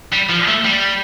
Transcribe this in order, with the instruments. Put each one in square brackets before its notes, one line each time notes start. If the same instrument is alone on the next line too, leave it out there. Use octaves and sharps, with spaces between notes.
[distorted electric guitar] G3
F3
A3
G3